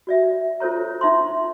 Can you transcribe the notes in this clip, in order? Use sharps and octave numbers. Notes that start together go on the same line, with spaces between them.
F#4 D5 E5
F4 A4 C5 C#5 A#5
D#4 F4 E5 A5 C6